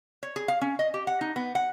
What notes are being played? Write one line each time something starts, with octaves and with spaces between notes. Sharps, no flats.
C#5
G#4
F5
C#4
D#5
G4
F#5
D#4
B3
F#5